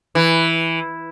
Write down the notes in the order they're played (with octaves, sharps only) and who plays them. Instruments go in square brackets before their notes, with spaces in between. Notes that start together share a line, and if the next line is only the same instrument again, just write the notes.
[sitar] E3